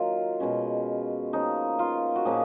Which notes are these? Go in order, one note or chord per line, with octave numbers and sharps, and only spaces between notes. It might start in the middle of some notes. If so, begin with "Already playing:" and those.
Already playing: D#3 F#3 A#3 F4
B2 G#3 C#4
F3 A#3 C#4 D#4
F4
F#4
A#2 F3 A#3 C#4 G#4